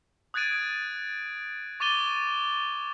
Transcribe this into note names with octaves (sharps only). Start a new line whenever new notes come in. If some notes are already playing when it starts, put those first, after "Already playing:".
D#6 F#6 G#6 A6 D7 D#7
C#6 D6 A6 D#7 G7